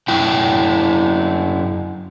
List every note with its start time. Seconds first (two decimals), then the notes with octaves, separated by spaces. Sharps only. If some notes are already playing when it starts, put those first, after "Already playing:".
0.08 F#2 E4 G5